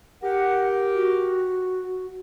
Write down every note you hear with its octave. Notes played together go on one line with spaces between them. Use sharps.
G4 A#4 F#5
F#4